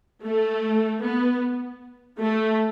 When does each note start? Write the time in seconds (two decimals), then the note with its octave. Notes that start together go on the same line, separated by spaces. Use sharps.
0.23 A3
1.02 B3
2.20 A3